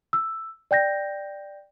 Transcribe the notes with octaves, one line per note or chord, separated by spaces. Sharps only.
E6
D5 G5 G6 A#6